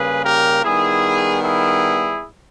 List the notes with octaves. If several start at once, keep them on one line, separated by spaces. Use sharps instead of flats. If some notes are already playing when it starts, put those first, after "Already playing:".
Already playing: C#3 G3 A#3 G#4 B4
G4 A#4
D#3 G3 B3 E4 G#4
E4 G#4